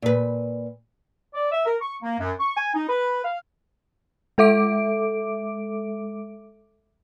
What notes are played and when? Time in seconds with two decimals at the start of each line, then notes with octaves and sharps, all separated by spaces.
0.02 A#2 B4
1.34 D5
1.52 E5
1.66 A#4
1.81 C#6
2.03 A#3
2.19 F#2
2.39 C#6
2.57 G#5
2.75 D#4
2.89 B4
3.24 F5
4.38 G#3 A4 E5 D6 D7